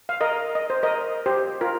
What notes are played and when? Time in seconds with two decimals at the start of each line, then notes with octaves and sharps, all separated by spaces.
0.09 F5
0.21 A#4 D#5
0.55 D#5
0.70 C5
0.83 A#4 D#5
1.26 G4 C5
1.61 F4 A#4